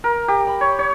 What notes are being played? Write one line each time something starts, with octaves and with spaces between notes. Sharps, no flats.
A#4
G4
B5
C#5
C#5